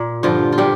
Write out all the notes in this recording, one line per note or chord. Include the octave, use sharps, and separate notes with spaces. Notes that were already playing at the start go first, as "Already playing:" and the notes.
Already playing: A#2
G2 D3 F3 F4
F4
A#2 G3 G4